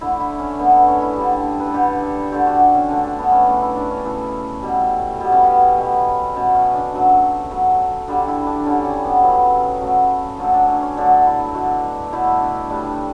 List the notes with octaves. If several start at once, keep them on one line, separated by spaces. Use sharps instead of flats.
D3 A3 E4
E4
C#4
D3 A3 B3
C#4
C#4
E4
D3 G3
B4
A4
D3 G3 G4
A4
D3 A3 G4
F#4
C#4
D3 A3 D4
D4
B3
C#4
C#3 E3 A3 D4
E4
D4
C#4
C#3 E3 A3
B2 G3
B2 G3 B3
C#4
B3
B2 A3
B2 A3 C#4
C#4
D4
C#3 F#3 A3
C#3 F#3 A3
D3 G3 D4
E4
D4
D3 G3 C#4
C#4
B3
C#3 F#3 A3
C#3 F#3 A3
D3 F#3 A3 C#4
D4
C#4
C#4
D3 F#3 A3 D4
E4
B2 A3 F#4
B2 A3 E4
D4
A2 G3 D4